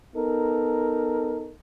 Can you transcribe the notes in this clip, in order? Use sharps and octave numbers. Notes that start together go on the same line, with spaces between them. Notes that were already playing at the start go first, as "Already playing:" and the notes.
B3 D#4 A4 A#4